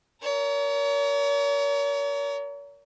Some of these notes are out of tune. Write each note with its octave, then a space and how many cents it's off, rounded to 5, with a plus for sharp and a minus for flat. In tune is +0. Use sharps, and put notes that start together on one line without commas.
A#4 +0 C#5 +40